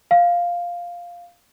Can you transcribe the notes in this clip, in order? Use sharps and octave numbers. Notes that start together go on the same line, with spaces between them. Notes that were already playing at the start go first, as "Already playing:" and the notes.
F5